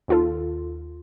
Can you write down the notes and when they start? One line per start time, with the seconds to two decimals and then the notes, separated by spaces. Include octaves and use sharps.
0.08 D#2 F4 A4